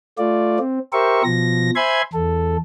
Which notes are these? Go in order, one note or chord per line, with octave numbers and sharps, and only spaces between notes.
A3 F4 D5
C4
G4 A#4 C5 E5 C#6
B2 F3 A#6
C5 E5 G#5 B5 C6 G#6
E2 A4